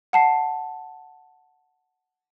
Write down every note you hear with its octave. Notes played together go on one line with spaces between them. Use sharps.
F#5 A5 C7